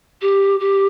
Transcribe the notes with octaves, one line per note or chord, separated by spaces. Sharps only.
G4
G4